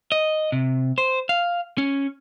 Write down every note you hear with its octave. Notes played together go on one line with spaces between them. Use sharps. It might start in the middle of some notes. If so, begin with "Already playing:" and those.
D#5
C3
C5
F5
C#4